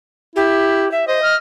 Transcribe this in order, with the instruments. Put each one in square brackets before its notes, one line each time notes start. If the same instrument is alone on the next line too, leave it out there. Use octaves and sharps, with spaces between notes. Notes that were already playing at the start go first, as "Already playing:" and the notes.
[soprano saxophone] E4 [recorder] G4
[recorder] E5
[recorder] C5 [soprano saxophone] D#5
[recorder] F6